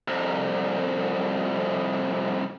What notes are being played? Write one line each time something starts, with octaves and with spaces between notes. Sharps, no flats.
C2 F2